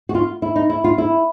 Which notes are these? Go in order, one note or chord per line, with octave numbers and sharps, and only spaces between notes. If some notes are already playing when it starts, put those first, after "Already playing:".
F#4
F4
E4
D#4
E4
F4
E4